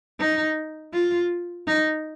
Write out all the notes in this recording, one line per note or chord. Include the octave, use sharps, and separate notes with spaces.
D#4
F4
D#4